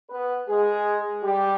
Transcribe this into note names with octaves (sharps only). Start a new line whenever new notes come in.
B3 B4
G#3 G#4
G3 G4